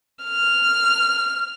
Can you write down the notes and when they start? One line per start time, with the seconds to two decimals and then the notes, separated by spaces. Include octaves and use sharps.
0.24 F6